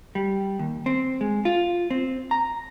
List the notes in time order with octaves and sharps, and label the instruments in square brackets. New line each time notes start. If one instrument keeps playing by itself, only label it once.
[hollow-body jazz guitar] G3
D#2
C4
G#3
F4
C4
A#5